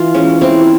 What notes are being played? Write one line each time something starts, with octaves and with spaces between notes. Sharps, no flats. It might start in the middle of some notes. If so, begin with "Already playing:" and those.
Already playing: E3 F4
G#3 C#4
G#3 C4 E4